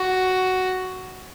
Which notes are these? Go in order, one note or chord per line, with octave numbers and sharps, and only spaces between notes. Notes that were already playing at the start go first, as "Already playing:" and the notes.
Already playing: F#4